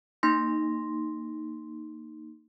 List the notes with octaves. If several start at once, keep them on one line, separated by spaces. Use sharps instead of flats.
A#3 D#4 C6 A#6